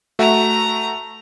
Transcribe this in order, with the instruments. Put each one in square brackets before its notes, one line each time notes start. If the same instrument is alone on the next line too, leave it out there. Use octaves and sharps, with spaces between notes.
[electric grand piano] A3 F#4 E5 [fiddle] A#5